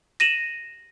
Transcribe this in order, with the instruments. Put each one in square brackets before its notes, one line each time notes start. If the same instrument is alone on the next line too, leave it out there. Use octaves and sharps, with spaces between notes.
[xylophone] A#6 D#7 E7 F#7